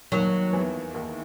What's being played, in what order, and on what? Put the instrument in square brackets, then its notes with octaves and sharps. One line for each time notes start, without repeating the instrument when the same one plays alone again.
[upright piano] D#2 D#3 [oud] F#3
[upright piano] E2 E3
D#2 D#3